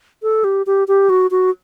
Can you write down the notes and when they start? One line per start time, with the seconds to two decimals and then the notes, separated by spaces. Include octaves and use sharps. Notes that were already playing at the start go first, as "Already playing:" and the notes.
0.23 A4
0.44 G4
0.66 G4
0.88 G4
1.10 F#4
1.31 F#4